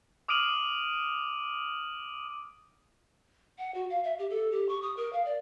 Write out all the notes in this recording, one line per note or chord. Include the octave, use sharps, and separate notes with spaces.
D6 D#6 F6 D7 D#7 F#7
F#5
F#4
F5
E5
G4
A4
G4
C#6
D#6
A#4
F5
D5